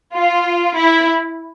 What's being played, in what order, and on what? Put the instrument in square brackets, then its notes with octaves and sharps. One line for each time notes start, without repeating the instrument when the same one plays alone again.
[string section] F4
E4